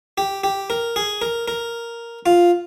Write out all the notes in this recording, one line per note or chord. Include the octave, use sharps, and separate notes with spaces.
G4
G4
A#4
G#4
A#4
A#4
F4